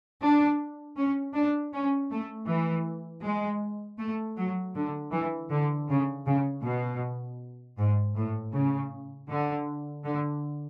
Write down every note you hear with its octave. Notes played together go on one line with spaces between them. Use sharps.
D4
C#4
D4
C#4
A3
E3
G#3
A3
F#3
D3
E3
D3
C#3
C#3
B2
G#2
A2
C#3
D3
D3